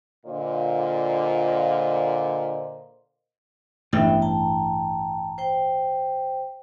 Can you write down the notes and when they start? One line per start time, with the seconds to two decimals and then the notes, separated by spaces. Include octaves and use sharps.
0.26 A#2 D3 F4 C5 D#5
3.93 A1 G2 B3 E5 G5
4.22 G5 A5 A#5
5.38 C5 G5